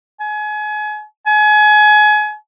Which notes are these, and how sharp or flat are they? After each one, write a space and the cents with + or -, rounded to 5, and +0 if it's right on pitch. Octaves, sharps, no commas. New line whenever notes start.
G#5 +30
G#5 +30